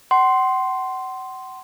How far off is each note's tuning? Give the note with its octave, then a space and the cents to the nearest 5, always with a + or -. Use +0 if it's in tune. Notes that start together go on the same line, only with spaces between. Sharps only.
F#5 +35 C6 +0